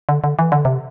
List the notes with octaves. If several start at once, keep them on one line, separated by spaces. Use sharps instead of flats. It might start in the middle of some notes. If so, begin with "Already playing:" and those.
D3
D3
E3
D3
C3